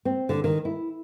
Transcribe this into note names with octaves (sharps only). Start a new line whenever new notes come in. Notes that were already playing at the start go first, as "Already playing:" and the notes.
C4
D3
D#3
E4